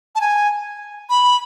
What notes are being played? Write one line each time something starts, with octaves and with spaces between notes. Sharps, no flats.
A5
G#5
B5